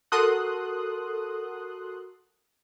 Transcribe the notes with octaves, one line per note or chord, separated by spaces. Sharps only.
F#4 A4 A#4 C6 D#6 F#6